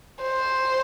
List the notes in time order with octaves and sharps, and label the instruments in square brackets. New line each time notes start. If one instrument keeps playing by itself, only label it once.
[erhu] C5